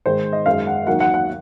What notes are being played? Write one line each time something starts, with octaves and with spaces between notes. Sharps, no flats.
G#2 D#3 G#3 C5
D#5
F#2 D#3 G#3 F5
F#5
D#2 D#3 F#3 F#5
F#5
F#5